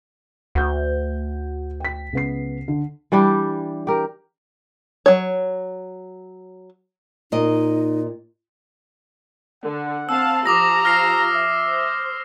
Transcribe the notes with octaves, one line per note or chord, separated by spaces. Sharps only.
D2 F#5 G6
G5 B6
C#2 B3 C7
D3
E3 G3 D4 G4
G4 A#4
F#3 C#5
A#2 D#4 D#5
D3 F#5
C4 F5 A5 E6
F3 F4 G4 A#5 D6 D#6 A#6
F6 A#6 C7
E5
C5